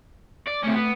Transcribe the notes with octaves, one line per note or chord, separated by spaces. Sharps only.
D5
C3 A3 C#4
B3